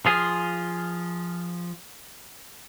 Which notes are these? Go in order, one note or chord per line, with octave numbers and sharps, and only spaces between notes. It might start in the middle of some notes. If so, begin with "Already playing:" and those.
F3 F4 G#4